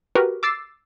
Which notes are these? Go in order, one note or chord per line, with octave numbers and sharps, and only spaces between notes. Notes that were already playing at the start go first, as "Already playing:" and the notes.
F#4 G4 A#4 B4
D6 E6 A6 C7